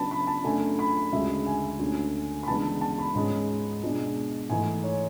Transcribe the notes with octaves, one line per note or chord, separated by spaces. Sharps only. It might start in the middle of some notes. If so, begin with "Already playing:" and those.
Already playing: C#3 F#3 B3 D4 A5 B5
B5
A5
F#2 D3 F#3 A3 D4 G#5
B5
D2 C#3 G#3 E5
G#5
D2 D3 A3 C#4
B5
C#3 E3 G#3 B3 D4 A5
A5
B5
G#2 G#3 C#4
B2 G#3 D4
G#2 E3 A3 G#5
C#5